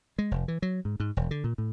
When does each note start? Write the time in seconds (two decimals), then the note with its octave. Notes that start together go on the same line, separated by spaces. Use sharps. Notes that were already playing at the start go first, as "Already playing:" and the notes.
0.19 G#3
0.31 F1
0.48 E3
0.62 F#3
0.85 G#2
1.00 G#2
1.17 E1
1.31 D3
1.44 A#2
1.58 A2